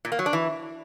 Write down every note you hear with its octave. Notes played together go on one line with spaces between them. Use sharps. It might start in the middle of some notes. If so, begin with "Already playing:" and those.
A#2
A#3
F#3
D4
E3